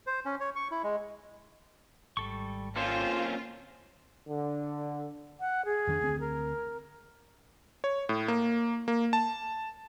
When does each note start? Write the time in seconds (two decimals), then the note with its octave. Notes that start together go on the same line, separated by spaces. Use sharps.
0.07 C5
0.25 C#4
0.40 C#5
0.56 C#6
0.71 E4
0.83 G#3
2.17 G#1 G3 A4 C#6
2.76 A#3 C4 C#4 F4 A4 C5
4.28 D3
5.40 F#5
5.65 G#4
5.87 F2 D#3 D4
6.01 D2 C4
6.20 A#4
7.84 C#5
8.09 A2
8.28 A#3
8.88 A#3
9.13 A5